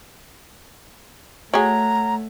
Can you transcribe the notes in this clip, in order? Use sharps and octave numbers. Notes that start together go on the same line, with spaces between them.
A3 F#4 G#4 C#5 F#5 A#5 G#6